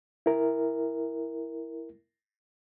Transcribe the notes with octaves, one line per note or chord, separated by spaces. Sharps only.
E4 A#4